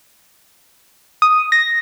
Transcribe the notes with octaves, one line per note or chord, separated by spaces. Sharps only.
D#6
A#6